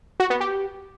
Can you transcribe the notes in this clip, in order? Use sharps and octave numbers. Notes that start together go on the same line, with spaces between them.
F#4
B3
G4